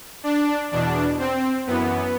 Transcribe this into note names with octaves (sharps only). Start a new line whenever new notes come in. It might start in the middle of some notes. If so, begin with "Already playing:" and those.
D4
E2 B2 D4
C4
F#2 E3 B3